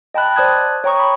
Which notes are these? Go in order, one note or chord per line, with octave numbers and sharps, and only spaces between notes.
D#5 G5 A5 B5 F#6
C5 D5 A5 D#6 F#6 G#6
C#5 G5 A#5 C#6 D#6
B5 C#6